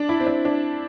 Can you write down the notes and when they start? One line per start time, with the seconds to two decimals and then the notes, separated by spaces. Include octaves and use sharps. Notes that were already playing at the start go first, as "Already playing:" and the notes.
Already playing: D4
0.09 E4
0.20 C4
0.27 D4
0.45 D4